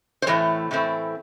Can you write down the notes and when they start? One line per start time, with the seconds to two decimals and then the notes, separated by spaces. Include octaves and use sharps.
0.22 C5
0.26 A2 E3 A3 C4 C#5
0.71 A2 E3 A3 C4